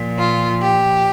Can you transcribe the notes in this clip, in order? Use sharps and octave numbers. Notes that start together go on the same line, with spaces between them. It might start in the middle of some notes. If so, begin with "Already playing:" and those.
Already playing: A#2 F3
F4
G4